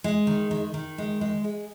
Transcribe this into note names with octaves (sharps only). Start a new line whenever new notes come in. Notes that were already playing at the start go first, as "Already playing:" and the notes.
G#3
D#3
D#3
D#3
G#3
G#3
G#3